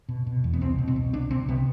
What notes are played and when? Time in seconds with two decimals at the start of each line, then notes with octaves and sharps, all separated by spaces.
0.09 B2
0.27 B2
0.44 E2
0.53 B3
0.61 C2 C4
0.78 B2
0.88 C4
0.96 B2
1.13 C2 D4
1.31 C3 C4
1.48 C3 B3